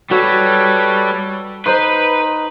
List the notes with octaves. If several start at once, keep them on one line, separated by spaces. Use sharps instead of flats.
G3 F#4 A4 B4 C#5
D#4 B4 C5 C6